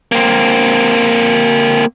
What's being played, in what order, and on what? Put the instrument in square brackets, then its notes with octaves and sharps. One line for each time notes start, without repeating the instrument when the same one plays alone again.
[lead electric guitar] A#3 C4